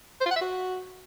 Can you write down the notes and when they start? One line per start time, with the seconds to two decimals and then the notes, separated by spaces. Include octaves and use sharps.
0.21 C5
0.26 F4
0.31 F#5
0.36 E5
0.41 F#4